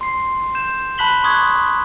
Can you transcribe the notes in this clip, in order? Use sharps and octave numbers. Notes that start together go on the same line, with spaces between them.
C6 C7
G6 E7
A5 B5 F#6 B6 F#7 G7
C6 C#6 D#6 F#6 G#6